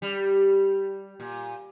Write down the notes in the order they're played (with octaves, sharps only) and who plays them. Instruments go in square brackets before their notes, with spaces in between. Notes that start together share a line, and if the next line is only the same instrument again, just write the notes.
[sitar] G3
A#2